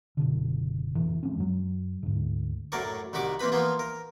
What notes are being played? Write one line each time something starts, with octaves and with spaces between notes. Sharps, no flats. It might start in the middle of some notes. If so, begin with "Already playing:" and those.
F#1 B2 D3
F1 A2 E3
F3 G#3 C4 C#4
F#2 F#3
D2 G#2
F#2 A2 F#3 A#4 D5 C#6
C2 D#3 F#4 B5 C#6 D6
E3 A#3 C4 B4 B5
E3 F3 A#3 B3 F4
A#4